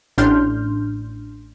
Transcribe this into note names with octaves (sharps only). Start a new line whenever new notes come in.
A1 A2 D4 C6 F6 G6